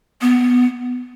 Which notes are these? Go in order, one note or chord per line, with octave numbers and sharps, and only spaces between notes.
B3